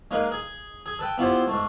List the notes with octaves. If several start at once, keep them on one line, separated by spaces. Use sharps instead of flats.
G#3 A#3 D#4 A#4 B4
G#4
G#4
A4 B4 G5
B3 E4 F4 G4 C5
G#2 A3